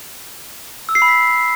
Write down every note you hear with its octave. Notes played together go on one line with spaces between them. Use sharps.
E6
C7
B5
B6